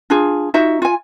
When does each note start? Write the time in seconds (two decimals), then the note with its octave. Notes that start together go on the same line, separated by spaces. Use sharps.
0.10 D4 F4 G#4
0.54 D#4 F4 F#4 E5
0.82 F4 G#5